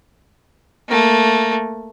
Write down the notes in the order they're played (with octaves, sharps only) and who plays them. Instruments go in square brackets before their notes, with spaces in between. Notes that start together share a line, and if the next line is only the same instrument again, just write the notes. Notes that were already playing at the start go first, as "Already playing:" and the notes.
[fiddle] A3 A#3